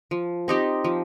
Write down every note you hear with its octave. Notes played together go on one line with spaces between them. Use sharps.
F3
C4 D#4 G4
F3